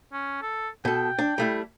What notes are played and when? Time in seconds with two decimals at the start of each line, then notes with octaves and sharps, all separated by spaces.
0.13 C#4
0.42 A4
0.85 B2 A4 G5
1.19 D4
1.38 G3 A3 E4